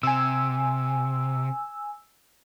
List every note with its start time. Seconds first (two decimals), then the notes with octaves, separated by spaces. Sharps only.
0.03 C3 G#5 E6